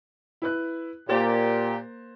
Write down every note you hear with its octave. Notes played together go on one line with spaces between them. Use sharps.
E4 B4 F#6
A#2 A#3 G4 C5 A6